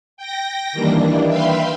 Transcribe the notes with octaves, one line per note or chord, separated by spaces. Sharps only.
G5 A#6
D#3 E3 G3 A#3 D4
B4 E5 F5 G5 B5 C6